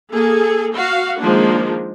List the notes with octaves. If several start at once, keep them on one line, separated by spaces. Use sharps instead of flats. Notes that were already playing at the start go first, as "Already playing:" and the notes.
A#3 G#4 A4
F#4 F5
D#3 F3 G#3 A#3 D4